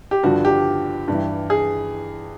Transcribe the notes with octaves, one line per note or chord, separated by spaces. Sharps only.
G4
G2 D3 F3 F#4
G4
G2 E3
G#4